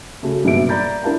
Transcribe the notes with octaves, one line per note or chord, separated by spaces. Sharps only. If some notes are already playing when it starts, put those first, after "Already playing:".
C#3 A3 F#4
F#1 G2 B2 B3 E5 D7
D5 A#5 B5 G6 A6
D4 E4 A#4 F5 A5